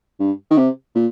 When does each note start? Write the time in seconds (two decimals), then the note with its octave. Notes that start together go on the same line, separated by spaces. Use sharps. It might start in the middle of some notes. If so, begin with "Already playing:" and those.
0.20 G2
0.51 D#3
0.57 C3
0.95 A#2